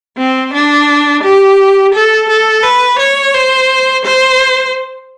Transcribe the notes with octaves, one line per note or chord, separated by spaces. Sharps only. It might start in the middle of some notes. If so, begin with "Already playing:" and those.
C4
D4
G4
A4
A4
B4
C#5
C5
C5